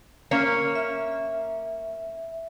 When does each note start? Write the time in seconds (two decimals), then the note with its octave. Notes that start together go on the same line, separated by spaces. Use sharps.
0.31 A#3 C#4 C#5
0.75 E5